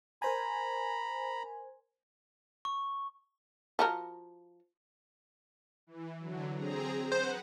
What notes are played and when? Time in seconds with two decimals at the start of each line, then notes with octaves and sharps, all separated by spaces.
0.22 A#4 C5 G#5 A#5 B5
2.65 C#6
3.79 F3 F#4 A#4
5.87 E3
6.19 D3 F#3
6.55 C4 G#4 A#5
7.12 B4 C5 F#5